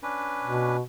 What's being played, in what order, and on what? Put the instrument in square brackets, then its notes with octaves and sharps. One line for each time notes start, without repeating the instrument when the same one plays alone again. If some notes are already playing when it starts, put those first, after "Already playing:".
[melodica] C#4 D4 B4
[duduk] B2